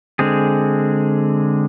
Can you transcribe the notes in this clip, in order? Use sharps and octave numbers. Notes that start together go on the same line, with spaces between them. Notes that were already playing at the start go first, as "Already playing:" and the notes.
D3 G#3 C4 G#4